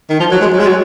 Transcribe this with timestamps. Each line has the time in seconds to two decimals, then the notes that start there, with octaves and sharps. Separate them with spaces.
0.10 D#3
0.20 F3
0.31 F#3
0.41 G#3
0.53 F#3
0.60 G#3
0.67 F#3